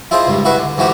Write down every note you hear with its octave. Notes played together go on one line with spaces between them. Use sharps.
E4 F4 G#4 C5 D#5
C#2 G#2 G3
E4 F#4 G#4 B4 E5
D3
G#2 E3 A3 F#4 G4